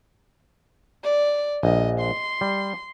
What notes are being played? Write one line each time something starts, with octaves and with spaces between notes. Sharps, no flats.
D5
A#1 D#5
C6
G3